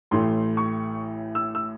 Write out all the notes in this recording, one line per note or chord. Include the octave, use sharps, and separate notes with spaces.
A1 A2 E3 A3 C6
C#6
E6
E6